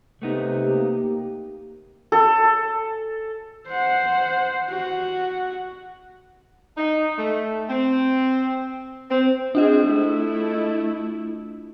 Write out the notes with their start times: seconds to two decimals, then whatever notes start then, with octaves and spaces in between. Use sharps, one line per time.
0.22 C3 A3 B3 D#4
0.63 A#3 G4
2.12 A4
3.68 C5 F#5
4.69 F#4
6.77 D#4
7.18 A3
7.69 C4
9.11 C4
9.55 C4 D4 F4 G#4 D#5
9.87 A3 E4